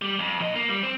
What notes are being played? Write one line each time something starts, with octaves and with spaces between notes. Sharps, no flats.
G3
F2
A#2 D#5
A#3
G3
C4